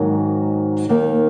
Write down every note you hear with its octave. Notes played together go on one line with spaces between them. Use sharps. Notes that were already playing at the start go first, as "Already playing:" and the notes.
Already playing: G#2 D#3 F#3 A#3
D#2 D#3 A#3